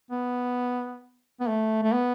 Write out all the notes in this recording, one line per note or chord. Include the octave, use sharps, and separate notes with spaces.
B3
B3
A3
A3
B3